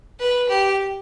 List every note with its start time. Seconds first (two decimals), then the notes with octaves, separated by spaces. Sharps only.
0.20 B4
0.49 G4